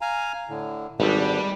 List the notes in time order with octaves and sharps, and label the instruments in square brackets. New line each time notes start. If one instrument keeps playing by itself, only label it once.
[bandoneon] F5 G#5 A#5
A2 D3
[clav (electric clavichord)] G#1 [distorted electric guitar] G3 [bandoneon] D4 B4